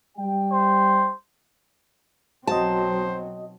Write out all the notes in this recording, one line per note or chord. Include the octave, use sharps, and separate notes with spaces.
G3 G5
C5
B1 F#3 C4 F#4 C5 D#5 A5